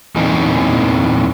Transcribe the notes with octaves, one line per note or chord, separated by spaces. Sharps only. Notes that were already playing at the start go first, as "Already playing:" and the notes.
E2 A#2 E3 C4 D#4